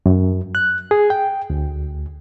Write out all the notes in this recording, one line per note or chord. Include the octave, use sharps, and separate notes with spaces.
F#2
F#6
G#4
G5
D2